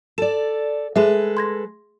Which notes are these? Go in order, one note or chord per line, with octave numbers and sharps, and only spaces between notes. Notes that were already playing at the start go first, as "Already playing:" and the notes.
A4 D5 E7
G#3 G#4 A4 B4 E5
C6 G#6 A#6